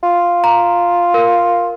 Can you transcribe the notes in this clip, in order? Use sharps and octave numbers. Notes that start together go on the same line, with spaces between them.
F4
A#5
A#4